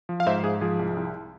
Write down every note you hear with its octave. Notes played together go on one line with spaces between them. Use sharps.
F3
F5
G#2 C5 E5
G#2 G#4
F3 G#4
C2
C2